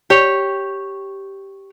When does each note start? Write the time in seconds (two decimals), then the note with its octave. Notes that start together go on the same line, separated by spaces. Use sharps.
0.10 G4 C#5